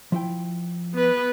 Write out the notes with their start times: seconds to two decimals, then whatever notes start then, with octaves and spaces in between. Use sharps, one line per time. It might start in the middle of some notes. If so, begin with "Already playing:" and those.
0.12 F3 E4 G5
0.94 B3 B4